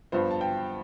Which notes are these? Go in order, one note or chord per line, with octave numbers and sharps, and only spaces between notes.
G2 F3 B3 C5
A5
G5